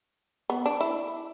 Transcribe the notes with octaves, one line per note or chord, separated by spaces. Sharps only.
B3
D4
E4